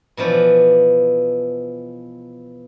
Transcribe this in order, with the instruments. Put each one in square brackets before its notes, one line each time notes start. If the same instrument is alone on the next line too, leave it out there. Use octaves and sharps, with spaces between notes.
[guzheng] B2 E3 F3 D5